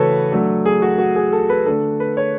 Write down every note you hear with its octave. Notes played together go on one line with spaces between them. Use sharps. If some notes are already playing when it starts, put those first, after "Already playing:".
Already playing: C#3 E3 A3 F#4 A4 B4 C#5
F#3 A3 D4
G#4
F#4
F#4
G#4
A4
B4
D3 A3 D4 A4
B4
C#5